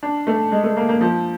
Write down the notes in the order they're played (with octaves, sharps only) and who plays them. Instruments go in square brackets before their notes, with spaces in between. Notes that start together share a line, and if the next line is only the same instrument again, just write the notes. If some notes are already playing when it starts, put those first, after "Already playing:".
[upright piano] D4
A3
G#3
A3
A#3
A#3
F3